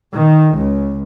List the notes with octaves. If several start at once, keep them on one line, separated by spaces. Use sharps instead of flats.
D#3
C#2